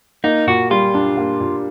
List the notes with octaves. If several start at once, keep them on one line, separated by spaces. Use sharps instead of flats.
A#3 D#4
A#2 F#4
G3 F4
D4
A#3
A#2